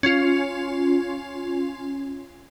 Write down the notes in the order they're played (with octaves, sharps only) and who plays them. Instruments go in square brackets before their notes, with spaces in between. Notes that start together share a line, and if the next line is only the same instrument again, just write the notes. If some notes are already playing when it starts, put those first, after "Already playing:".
[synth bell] C#4 F4